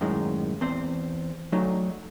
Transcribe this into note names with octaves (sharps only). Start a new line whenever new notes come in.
F#2 A2 D#3 G#3
E2 C4 C5
F#3 A3 D#4